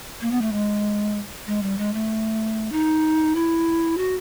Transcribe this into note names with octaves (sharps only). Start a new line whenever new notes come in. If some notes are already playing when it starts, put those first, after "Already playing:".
A#3
B3
A3
G#3
G#3
G3
G#3
A3
D#4
E4
F#4